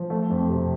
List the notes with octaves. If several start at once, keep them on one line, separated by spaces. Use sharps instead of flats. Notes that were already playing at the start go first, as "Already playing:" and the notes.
Already playing: F3
A3
F2
C3